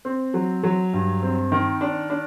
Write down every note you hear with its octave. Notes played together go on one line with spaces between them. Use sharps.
C4
F#3
F#3
G2
C4
D#3
D4
D4